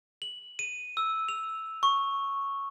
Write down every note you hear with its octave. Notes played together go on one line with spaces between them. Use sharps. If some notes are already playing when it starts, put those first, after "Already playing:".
F#7
D#7
E6
F7
C#6